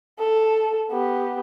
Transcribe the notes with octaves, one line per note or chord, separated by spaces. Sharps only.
A4
B3 G4